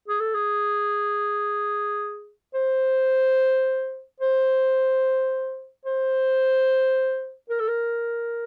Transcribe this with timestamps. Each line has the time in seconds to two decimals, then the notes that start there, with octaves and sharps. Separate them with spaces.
0.08 G#4
0.20 A4
0.34 G#4
2.54 C5
4.20 C5
5.85 C5
7.50 A#4
7.59 A4
7.68 A#4